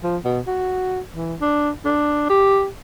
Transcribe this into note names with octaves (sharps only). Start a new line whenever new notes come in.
F3
B2
F#4
E3
D4
D4
G4